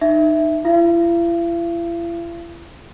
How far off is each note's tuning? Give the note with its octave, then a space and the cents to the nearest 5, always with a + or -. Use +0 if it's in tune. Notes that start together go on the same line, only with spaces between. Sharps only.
D#4 -20 E5 +0
E4 +40 F5 -45